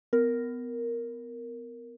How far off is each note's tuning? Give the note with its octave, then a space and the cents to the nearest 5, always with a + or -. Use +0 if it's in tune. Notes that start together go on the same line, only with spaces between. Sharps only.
B3 +25 A#4 +0